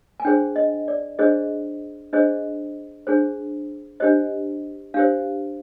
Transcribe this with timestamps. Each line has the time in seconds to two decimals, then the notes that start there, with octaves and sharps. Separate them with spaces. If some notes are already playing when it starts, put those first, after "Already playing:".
0.20 G#5
0.25 D4 G#4 C5 G5
0.56 D#5
0.88 D5
1.19 D4 G#4 C5 D#5
2.13 D4 G#4 C5 D#5
3.07 D4 G#4 C5
4.00 D4 G4 C5 D#5
4.94 D4 G4 C5 F5